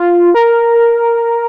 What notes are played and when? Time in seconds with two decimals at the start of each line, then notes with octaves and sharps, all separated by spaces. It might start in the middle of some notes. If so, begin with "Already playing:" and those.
Already playing: F4
0.34 A#4